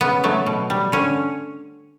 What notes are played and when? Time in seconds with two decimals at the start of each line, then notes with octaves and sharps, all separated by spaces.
0.01 C#3 B3
0.24 F#3 A3
0.46 B2
0.70 G3
0.92 D3 C#4